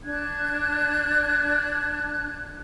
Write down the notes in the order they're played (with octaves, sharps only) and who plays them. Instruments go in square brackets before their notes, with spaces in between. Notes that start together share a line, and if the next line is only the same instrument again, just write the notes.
[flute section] D4 F#6 G#6